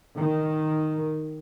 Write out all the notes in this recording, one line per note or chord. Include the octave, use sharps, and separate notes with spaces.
D#3